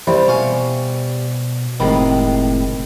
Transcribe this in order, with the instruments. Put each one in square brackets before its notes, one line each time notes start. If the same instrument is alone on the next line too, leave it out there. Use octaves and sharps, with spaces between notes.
[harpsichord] C2 [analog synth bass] E3 [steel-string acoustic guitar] G3 [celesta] C5 E5 B5
[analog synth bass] B2 [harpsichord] F5 G#5 C#6
[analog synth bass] F#1 [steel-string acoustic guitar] A2 C3 G#3 [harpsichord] D#3 [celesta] B5